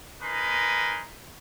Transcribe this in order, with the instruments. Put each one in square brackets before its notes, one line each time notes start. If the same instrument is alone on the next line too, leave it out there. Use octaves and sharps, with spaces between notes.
[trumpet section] D#4 A#4 B4 G#5 C6